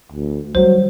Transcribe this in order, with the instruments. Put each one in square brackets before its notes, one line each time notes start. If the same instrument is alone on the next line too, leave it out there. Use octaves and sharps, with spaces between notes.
[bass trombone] D2
[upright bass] D#3 G3 [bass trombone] F#3 [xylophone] C5